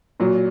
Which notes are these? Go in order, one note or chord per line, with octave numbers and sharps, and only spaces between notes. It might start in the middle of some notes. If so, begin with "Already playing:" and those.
A#2 F#3